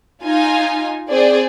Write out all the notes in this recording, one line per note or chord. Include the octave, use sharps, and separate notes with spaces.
D#4 F4 G#5
C4 G#4 D5